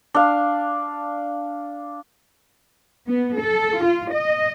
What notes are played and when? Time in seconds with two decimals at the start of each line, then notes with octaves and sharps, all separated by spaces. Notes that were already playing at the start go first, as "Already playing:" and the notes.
0.14 D4 F5
3.08 B3
3.39 A4
3.81 F4
4.10 D#5